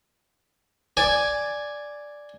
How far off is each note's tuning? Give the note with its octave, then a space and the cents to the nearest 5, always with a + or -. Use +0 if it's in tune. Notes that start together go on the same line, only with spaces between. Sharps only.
D5 +0 G#5 +0